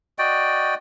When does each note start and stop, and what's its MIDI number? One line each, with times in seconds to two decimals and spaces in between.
0.19 0.75 66
0.19 0.75 74
0.19 0.75 75
0.19 0.75 79